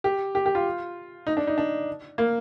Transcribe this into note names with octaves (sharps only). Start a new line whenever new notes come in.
G4
G4
G4
F4
D#4
D4
D#4
D4
A#3